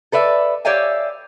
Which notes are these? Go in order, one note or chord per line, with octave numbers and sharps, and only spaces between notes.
A4 B4 D5 E5
G4 C#5 D5 E5 F5 G#5